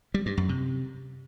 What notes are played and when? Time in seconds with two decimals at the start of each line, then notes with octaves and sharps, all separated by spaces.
0.14 G3
0.26 G2
0.37 F#2
0.49 C3